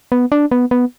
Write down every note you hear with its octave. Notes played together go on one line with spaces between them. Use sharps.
B3
D4
B3
B3